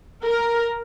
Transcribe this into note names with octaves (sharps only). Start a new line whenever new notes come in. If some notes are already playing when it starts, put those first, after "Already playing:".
A#4